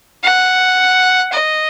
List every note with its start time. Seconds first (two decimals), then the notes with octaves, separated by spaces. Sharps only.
0.24 F#5
1.33 D#5